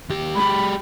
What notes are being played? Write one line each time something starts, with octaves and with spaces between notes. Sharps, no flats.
D#2 G4
G#3 G4 B5